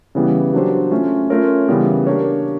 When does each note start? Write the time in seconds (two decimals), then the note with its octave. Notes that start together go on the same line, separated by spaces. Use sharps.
0.15 C#3 E3 G3 B3
0.54 F#3 A#3 D4 G4 C5
0.91 A3 C#4 F4
1.30 A3 C#4 F4 A#4 C#5
1.68 C#3 E3 G3 B3
2.07 A#3 D4 G4 A#4 C#5